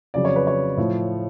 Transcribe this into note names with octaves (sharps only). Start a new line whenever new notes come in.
F2 C#3 F#3 D5
C#5
B4
C#5
A2 F3